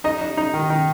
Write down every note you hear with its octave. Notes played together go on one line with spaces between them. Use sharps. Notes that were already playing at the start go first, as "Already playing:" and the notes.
D#4 D#5
D#4
D#4
D#3
D#3